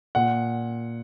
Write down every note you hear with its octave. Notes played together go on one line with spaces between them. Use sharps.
A#2 F#5